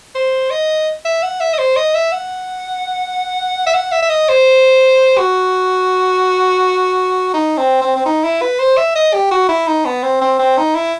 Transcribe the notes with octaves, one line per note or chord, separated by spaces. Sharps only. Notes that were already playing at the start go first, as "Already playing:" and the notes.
C5
D#5
E5
F#5
E5
D#5
C5
D#5
E5
F#5
E5
F#5
E5
E5
D#5
C5
F#4
D#4
C4
C4
C4
D#4
E4
B4
C5
E5
D#5
G4
F#4
E4
D#4
B3
C4
C4
C4
D#4
E4